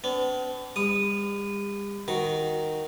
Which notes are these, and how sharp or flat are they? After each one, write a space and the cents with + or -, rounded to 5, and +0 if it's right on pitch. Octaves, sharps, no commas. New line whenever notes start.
B3 +45 D4 -40
G3 +45 D#6 -10
D#3 +0 F#4 -5